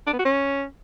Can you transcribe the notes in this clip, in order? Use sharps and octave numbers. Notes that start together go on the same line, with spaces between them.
D4
B3
F#4
C#4